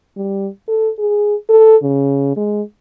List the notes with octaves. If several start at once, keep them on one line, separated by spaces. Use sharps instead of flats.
G3
A4
G#4
A4
C#3
G#3